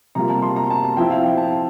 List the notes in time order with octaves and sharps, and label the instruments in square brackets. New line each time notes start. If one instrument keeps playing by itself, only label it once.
[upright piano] C3 G3 A#3 F4 A#5
A5
C6
A#5
A5
A5
F3 C4 E4 G5
F5
G5
A5